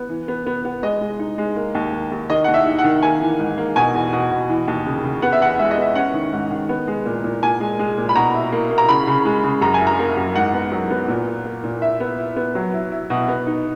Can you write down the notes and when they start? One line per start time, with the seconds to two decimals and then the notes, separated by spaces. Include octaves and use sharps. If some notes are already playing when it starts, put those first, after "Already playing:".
Already playing: B3
0.09 E3
0.28 B3
0.46 B3
0.65 B3
0.83 G#3 D#5
1.01 G#3
1.19 D#4
1.38 G#3
1.56 A#3
1.75 D#2
1.93 A#3
2.11 D#2
2.30 D#3 D#5
2.44 D#2 F#5
2.54 E5
2.66 D#4
2.79 F#5
2.84 D#3
3.03 A#3 G#5
3.21 E3
3.39 G#2
3.58 A#3
3.76 B2 G#5
3.94 E2
4.13 B2
4.31 B2
4.50 E3
4.67 D#2
4.86 C#3
5.04 C#3
5.22 B3 F#5
5.33 E5
5.41 E2 F#5
5.59 G#3 E5
5.71 D#5
5.77 B3 E5
5.95 C#4 F#5
6.14 D#3
6.33 G#2
6.51 D#3
6.69 B3
6.87 G#3
7.06 A#2
7.24 A#2
7.42 A#2 G#5
7.60 G#3
7.79 G#3
7.97 A#2
8.09 B5
8.15 B2 A#5
8.34 E4
8.52 A#3
8.71 A#3
8.78 A#5
8.89 C#3 B5
9.07 C#3
9.25 G#3
9.44 C#3
9.61 F#2 A#5
9.74 G#5
9.80 E4
9.87 A#5
9.99 A#3
10.17 F#2
10.35 G#2 F#5
10.54 B3
10.72 F#3
10.90 B3
11.08 A#2
11.27 A#3
11.45 A#3
11.64 A#2
11.82 E4 E5
12.00 B3
12.19 E4
12.36 B3
12.55 F#3
12.73 E4
12.92 E4
13.10 B2
13.28 B3
13.47 D#4